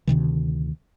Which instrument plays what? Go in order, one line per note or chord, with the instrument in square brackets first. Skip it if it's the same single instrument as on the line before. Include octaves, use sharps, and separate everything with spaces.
[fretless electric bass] D2 C3 D#3 E3